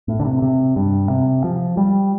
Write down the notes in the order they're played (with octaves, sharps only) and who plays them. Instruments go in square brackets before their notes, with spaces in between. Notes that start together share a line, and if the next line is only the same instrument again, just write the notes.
[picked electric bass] A2
D3
C3
C3
G2
C3
F3
G3